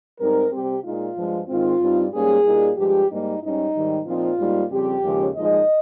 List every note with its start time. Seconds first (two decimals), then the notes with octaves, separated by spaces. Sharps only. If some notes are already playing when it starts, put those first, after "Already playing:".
0.18 G#2 G3 C4 D#4 A#4
0.51 C3 G3 C4 G4
0.83 A#2 G#3 D#4 F4
1.15 G2 F3 G#3
1.48 G#2 D#3 G#3 C4 F4
1.80 G2 G3 C4 D#4
2.12 G#2 G3 A#3 C#4 G#4
2.44 A#2 G3 A#3 D#4
2.77 G2 F3 G#3 G4
3.09 G#2 G3 A#3 D#4
3.41 G#2 G3 C#4 D#4
3.73 G#2 D#3 G3
4.06 A#2 F3 C4 D#4 F4
4.38 G#2 G3 A#3 D#4
4.70 F2 C#3 G3 C4 G4
5.03 D#2 C#3 F3 G#3 C#4
5.35 A#2 F3 G#3 D#4 D#5